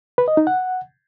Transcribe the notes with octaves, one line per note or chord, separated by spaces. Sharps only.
B4
D#5
D#4
F#5